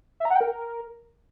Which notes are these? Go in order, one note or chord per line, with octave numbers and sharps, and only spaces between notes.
E5
A#5
F#5
G5
A#4